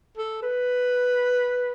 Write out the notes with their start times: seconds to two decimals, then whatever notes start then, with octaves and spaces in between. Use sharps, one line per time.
0.18 A4
0.43 B4